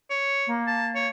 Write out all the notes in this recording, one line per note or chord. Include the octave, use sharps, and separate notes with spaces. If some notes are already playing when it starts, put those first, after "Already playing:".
C#5
A#3
A5
C#5